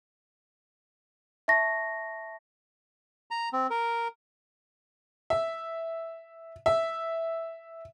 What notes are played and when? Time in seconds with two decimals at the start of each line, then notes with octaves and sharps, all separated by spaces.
1.48 E5 A5 C#6 A#6
3.31 A#5
3.53 C4
3.70 A#4
5.30 E5
6.66 E5